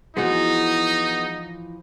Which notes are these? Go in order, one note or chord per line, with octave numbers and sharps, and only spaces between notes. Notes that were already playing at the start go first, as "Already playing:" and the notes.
E3 F3 G#3 B3 D#4 F#4